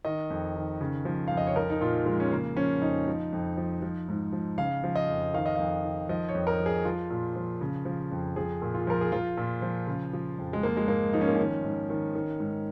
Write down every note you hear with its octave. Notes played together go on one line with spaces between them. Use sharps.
D#3 D#5
F2
D#3
C#3
F3
F2 F5
D#5
C#5
F3 A#4
D#4
A#2 F4
F3 G#3
C#4
C#3 A#3
F3 C#4
F2 D#4
F3
F2
F3
F3
G#2
F3
C#3 F5
F3
D#5
F2
D#3 F5
D#5
F2 F5
D#3
F3 D#5
C#5
F2
A#4
F3
G#4
F3 F4
A#2
F3
C#3
F3
F2
F3 G#4
A#2
F4
F3 A#4
G#4
F3 F4
A#2
F3
C#3
F3
F2
G#3
F3 A#3
G#3
G#2 A#3
F3 D#4
C#4
A#3
D#3 C#4
G#2
D#3
D#3
G#2